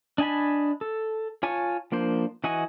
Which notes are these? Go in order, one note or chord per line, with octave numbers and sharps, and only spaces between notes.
D4 D#5 G#5 A5 B5
A4
F4 C#5 G#5 A5 C#6
F3 A#3 D4 C5
E3 F#4 D#5 G#5 C#6